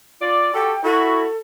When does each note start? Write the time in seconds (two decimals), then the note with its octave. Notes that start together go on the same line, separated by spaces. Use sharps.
0.22 F4 D5
0.54 F#4 G4 A4 G5
0.84 E4 F#4 A4